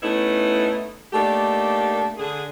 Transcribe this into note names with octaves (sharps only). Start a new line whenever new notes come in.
A3 B3 C#4 D#4 E4
A3 A#3 D4 D#4 G4
D3 G#4